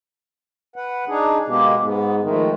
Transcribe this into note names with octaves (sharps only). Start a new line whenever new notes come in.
B4 F#5
D4 D#4 G#4
B2 G#3 A#3 G4
G#2 B3
D#3 F3 G#3 A3